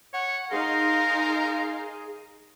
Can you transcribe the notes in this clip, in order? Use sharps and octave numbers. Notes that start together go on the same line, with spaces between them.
C#5 F#5
D#4 G#4 A#4 F5 C6